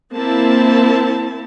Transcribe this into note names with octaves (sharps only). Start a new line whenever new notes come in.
A#3 C4 E4 A5